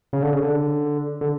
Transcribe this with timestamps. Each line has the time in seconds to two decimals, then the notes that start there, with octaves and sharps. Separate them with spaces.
0.13 C#3
0.22 D3
0.33 C#3
0.42 D3
1.21 D3